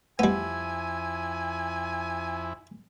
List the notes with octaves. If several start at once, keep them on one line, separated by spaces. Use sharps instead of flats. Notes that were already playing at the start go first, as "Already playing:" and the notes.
F2 G3 B3 E4 G#5